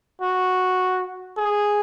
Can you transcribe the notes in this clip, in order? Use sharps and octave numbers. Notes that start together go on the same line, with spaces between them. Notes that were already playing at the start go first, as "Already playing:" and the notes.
F#4
G#4